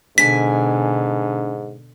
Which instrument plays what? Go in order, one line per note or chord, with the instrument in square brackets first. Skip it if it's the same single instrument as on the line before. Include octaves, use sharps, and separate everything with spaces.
[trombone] G#2 [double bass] B2 D3 [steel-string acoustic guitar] D4 G#5 [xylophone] B6